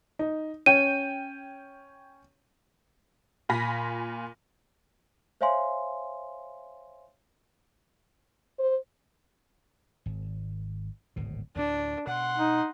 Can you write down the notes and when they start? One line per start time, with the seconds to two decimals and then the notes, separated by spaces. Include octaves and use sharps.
0.19 D#4
0.66 C#4 G5 D#7
3.49 A#2 F4 G#5 B5 A#6 B6
5.41 C5 C#5 E5 F5 G#5 C6
8.59 C5
10.06 G#1
11.16 D1 G#1 B2
11.56 D2 A2 D4
12.07 B2 F#5 C6
12.37 D#4